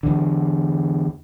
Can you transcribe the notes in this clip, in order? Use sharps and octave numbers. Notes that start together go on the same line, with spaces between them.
E2 D3